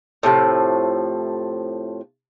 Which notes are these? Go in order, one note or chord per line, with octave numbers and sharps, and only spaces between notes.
A2 C3 F3